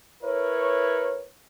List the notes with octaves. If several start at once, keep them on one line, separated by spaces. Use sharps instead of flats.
E4 A#4 B4 C#5